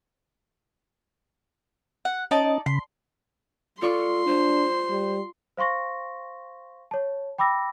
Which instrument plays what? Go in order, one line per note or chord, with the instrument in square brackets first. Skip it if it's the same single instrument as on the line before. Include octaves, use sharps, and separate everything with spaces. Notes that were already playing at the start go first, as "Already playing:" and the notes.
[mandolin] F#5
[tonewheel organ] C#4 D#5 [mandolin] D#4 D5 A5
[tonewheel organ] C#3 B5 [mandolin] C6
[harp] F4 D5 C#6 [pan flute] A4 [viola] C6
[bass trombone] D4 [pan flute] C5
[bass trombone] G3
[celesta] C5 F5 C6 C#6 A#6
C#5 A5
G5 B5 D6 E6 A#6